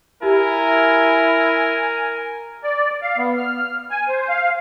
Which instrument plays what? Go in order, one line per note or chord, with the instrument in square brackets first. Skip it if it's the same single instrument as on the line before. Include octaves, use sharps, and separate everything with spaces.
[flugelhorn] E4 [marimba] G4 [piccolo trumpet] A#4 [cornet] G#5
[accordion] D5
F5
B3
F6
G#5
C5
F5